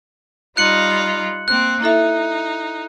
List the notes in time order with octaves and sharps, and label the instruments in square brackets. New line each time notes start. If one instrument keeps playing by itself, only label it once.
[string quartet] G3 D#4 F4 [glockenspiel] F#6 C#7 F#7
[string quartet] A#3 C4 [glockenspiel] F#6
[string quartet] D#4 [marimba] E4 A4 E5